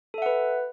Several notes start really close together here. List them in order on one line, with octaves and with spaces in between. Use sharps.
A4 E5 F#5 B4